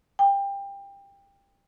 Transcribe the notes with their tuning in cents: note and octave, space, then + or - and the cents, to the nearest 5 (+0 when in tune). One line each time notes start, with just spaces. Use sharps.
G5 +25